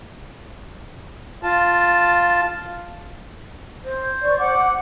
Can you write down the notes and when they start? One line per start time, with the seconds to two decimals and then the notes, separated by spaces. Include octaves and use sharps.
1.43 F4 A5
3.84 C5
4.22 D5 C#6
4.37 F#5 D6